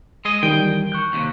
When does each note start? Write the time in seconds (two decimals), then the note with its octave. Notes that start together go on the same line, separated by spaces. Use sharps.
0.25 G#3 G#4 D#5
0.43 D#3 E3 G3 G5
0.92 C#6 F#6 G6
1.13 D#2 C3